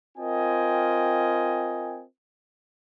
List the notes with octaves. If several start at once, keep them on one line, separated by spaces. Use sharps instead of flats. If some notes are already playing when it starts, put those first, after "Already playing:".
C4 F4 A#4 D#5 G5 G#5